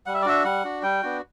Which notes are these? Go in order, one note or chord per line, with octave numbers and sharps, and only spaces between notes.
G3 F#5
E5
D5
D4 F#4 E5
G3 F#5
D4 F#4
G3 G5
B3 D4 F#4